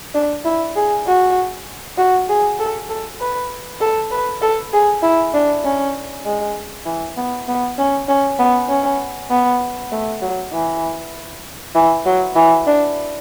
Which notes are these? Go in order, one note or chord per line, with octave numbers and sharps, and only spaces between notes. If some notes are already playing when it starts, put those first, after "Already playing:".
D4
E4
G#4
F#4
F#4
G#4
A4
A4
B4
A4
B4
A4
G#4
E4
D4
C#4
G#3
E3
B3
B3
C#4
C#4
B3
C#4
B3
A3
F#3
E3
E3
F#3
E3
D4